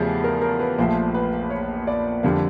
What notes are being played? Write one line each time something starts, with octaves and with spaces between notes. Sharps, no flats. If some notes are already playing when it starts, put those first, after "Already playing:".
Already playing: E2 C#3 F3 A3 G4 G#4
A#4
A#4
B4
A#1 A#2 F3 A3 C5
B4
C#5
D5
F2 D3 G3 A#3